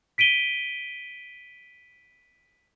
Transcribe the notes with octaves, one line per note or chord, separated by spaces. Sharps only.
B6 D7 D#7 G7